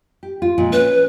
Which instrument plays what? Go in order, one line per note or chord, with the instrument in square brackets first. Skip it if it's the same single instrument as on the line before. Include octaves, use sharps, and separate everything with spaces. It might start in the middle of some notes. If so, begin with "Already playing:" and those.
[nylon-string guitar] G4
F4
A#2 F3 G#3
[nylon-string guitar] C#4 [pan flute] B4